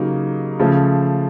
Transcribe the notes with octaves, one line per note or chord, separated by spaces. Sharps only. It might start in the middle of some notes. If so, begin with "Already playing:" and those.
Already playing: C#3 F#3 A#3 D#4 G4
C#3 F3 A3